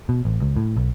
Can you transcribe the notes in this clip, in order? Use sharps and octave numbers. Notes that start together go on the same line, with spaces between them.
B2
A1
C#2
A2
B1